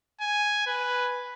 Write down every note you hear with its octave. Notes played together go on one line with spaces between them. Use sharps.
G#5
B4